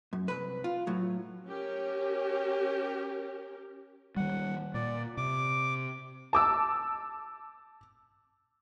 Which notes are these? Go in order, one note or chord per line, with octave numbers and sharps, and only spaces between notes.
F#2
C2 B4
F4
A2 F#3
C#4 G4 A#4
D#3 G3 F#5
A#2 D5
C3 D6
A5 D6 E6